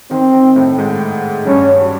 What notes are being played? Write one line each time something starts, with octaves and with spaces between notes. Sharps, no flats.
D#3 C4
D#3
A2 A3
G#2 G#3
G2 G3 C#4
F#3